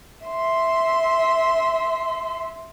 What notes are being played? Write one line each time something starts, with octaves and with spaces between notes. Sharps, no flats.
E5 C6